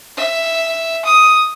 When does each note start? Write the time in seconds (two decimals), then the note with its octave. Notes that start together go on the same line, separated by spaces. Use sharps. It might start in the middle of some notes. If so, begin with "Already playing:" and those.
0.17 E5
1.05 D#6